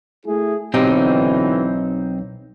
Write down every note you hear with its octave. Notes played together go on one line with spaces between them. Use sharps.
A3 E4 G#4
B1 B2 D3 E3 C4 D#4 G4